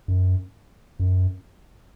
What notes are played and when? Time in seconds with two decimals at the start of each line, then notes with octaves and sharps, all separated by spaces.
0.08 F#2
1.00 F#2